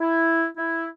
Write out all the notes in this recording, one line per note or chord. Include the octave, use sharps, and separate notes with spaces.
E4
E4